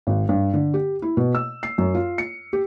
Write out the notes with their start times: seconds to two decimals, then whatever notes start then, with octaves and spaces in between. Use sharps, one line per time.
0.07 G#1
0.29 G2
0.54 D3
0.74 G4
1.02 E4
1.17 B2
1.35 E6
1.63 C7
1.78 F#2
1.94 F4
2.18 C#7
2.53 G4